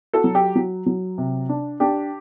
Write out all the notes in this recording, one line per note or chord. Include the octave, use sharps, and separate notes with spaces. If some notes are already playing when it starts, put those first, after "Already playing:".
F#4 A4
F#3
G4
F#3
F#3
C3
D4
D4 G4